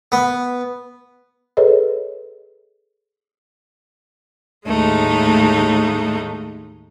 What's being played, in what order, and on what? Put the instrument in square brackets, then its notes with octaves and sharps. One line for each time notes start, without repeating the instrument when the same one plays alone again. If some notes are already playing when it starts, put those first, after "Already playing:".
[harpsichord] B3
[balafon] G#4 A4 B4 C#5 D#5
[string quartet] D#2 A2 G#3 A3 D#4